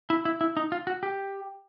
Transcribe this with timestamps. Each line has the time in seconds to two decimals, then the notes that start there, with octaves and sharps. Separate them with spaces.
0.10 E4
0.25 E4
0.41 E4
0.57 D#4
0.72 F4
0.87 F#4
1.03 G4